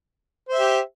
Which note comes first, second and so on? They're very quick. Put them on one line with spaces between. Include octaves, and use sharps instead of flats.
C5 E5 G4